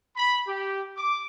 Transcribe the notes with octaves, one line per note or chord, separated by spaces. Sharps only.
B5
G4
D6